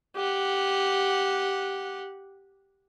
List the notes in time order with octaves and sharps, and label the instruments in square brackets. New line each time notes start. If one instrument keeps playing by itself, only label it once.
[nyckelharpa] G4 F#5